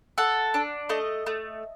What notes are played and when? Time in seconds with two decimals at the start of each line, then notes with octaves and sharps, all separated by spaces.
0.18 A4 F#5
0.54 D4
0.89 A3 D#5
1.26 A3